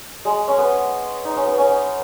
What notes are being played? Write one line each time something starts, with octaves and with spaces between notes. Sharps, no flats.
G#3
C#4
B3
D#4
C#4
B3
C#4